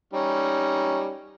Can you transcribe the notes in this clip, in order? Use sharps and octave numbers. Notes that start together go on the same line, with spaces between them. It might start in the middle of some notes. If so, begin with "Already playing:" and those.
G3 C#4 D#4